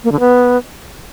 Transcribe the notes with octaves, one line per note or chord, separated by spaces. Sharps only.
A#3
D3
B3